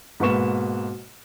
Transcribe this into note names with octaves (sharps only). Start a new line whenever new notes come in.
G#2 B2 A#3 B4 C#6 E7